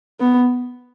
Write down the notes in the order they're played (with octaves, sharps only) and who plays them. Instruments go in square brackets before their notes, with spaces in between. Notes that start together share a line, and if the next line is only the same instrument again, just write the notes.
[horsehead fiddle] B3